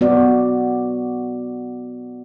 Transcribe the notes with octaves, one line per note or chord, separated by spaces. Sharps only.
B3 F#4 D5